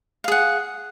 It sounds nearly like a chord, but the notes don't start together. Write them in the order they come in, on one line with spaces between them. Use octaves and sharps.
F5 G#4 F#5